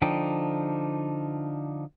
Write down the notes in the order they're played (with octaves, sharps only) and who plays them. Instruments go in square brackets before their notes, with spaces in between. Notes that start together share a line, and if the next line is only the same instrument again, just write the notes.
[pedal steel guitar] D3 F3 D4 D#4 G5